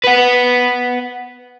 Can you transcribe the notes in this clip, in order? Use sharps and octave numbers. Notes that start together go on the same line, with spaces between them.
B4 F#5